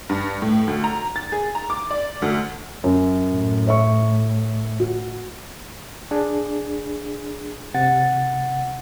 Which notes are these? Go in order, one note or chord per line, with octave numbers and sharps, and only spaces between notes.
G2
A2
D2
A#5
A6
G#4
A#5
D6
D5
D2
F#2
A2
C#5 E5 C#6
F#4
D4 G#4
C3 F#5 A6